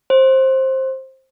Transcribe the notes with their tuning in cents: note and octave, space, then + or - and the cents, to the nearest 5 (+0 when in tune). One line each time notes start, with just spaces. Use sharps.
C5 +15